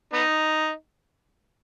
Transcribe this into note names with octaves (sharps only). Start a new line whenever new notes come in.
B3 D#4